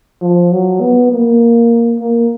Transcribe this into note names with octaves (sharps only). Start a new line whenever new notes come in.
F3
F#3
B3
A#3
A#3